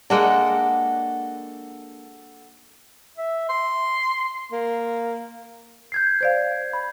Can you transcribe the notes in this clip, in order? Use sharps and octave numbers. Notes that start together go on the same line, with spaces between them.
G#3 A#3 D4 F#4 A4 F#5
E5
C6
A#3
G6 G#6 C7
C5 D5 F5
B5